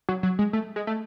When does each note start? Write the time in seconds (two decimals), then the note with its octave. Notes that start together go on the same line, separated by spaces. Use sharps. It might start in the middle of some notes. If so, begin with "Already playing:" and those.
0.09 F#3
0.23 F#3
0.39 G#3
0.53 A3
0.76 G#3
0.87 A3